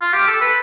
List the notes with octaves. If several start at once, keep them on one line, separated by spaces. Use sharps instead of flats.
F4
G4
A4
B4